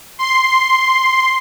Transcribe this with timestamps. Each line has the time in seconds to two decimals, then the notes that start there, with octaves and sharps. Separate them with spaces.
0.19 C6